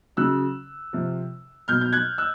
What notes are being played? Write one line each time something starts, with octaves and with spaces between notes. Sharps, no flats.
C#3 F#3 E6 F#6
C3 F3
B2 F#3 F6 G6
G6
F#6 G#6
E6 F#6